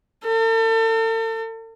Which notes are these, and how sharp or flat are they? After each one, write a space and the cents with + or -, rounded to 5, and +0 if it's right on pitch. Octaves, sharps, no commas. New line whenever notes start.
A4 +40